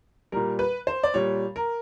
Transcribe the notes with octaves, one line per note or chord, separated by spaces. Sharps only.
A#2 G3 A#4
B4
C5
D5
A#2 G3 C#5
A#4